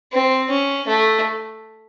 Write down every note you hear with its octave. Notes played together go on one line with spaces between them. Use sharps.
C4
C#4
A3